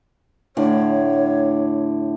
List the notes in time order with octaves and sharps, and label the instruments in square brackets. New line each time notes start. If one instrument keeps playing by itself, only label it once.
[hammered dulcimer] A2 D3 D5 [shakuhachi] C#5